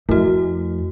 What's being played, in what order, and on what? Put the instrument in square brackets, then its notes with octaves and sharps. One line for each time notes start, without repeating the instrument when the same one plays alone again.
[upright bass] F2 [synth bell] A3 F#4 [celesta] E4 A#4 D#5